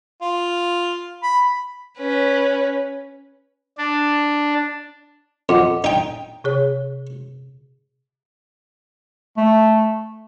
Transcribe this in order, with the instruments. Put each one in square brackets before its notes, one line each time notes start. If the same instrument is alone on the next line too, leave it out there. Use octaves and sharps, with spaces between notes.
[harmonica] F4
B5
[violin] C#4 B4
[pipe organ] D4
[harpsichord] F2 [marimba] D#5 F#5 D6
[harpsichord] D#4 G5
[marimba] C3 G#4 C#5
[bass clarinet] A3